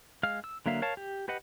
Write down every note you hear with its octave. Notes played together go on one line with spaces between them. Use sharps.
G#3 F5 F6
E6
D3 F#3 A#3 E5 F5
A#4 C#5 F5 A5
G4
G4 B4 D#5 F#5